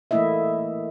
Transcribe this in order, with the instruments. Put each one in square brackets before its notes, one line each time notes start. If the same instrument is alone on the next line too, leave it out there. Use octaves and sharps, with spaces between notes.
[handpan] E3 A3 A#3 E4 D#5 E5